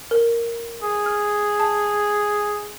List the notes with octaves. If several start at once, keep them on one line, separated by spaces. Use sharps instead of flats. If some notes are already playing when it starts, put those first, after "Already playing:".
A#4
G#4
F6
A5